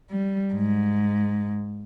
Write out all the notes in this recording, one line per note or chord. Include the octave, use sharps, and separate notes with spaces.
G3
G#2